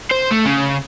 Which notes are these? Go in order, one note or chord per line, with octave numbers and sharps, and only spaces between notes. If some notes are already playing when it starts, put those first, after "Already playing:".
C5
A3
C#3